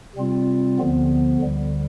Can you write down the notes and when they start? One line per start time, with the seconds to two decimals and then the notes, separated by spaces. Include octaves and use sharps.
0.15 C3 G3 C4 F4
0.78 D2 D3 F3 B3
1.41 D2 D3 G3